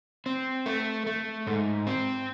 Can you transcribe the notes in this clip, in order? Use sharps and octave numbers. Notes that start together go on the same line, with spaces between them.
C4
A3
A3
G#2
C4